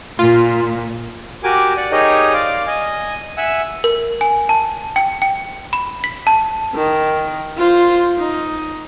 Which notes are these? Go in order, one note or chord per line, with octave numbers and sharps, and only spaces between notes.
A#2 F4
F#4 G4 A#4 G#5 D6
D5 F#5
D#4 G4 G#4 A#4 C#5 D#5
D5 F5 C6 D6
D#5 G#5
E5 F#5 G#5 E6
A#4
G#5
A5
G5
G5
B5
B6
A5
D#3
F4 C5
D#4